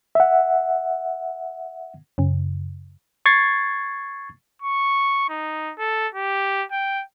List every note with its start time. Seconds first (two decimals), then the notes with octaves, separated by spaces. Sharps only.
0.15 E5 F#5
2.18 F#2 C#3
3.26 C#6 G#6 A6 C7
4.62 C#6
5.29 D#4
5.79 A4
6.15 G4
6.72 G5